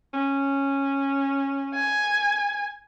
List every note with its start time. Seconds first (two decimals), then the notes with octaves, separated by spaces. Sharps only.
0.14 C#4
1.74 G#5